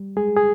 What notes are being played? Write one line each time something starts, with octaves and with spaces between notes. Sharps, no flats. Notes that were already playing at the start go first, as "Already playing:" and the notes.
Already playing: G3
G#3 G#4
G#4